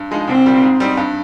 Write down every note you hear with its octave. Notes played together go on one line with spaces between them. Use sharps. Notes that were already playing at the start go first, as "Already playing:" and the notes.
Already playing: G2
F3 G#3 D#4
C2 C4
A#2 G3
G#2
G3 C4 D#4
G2